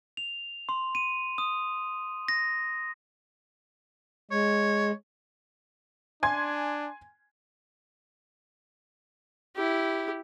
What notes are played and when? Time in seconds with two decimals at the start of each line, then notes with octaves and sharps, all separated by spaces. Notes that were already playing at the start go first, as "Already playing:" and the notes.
0.17 F7
0.69 C6
0.95 D#7
1.38 D#6
2.28 A#6
4.31 G#3 C#5
6.23 D4 G#5 C6 G#6
9.56 E4 G4